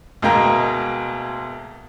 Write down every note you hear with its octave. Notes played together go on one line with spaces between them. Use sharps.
D2 B2 G#3 A#3 G5 A#5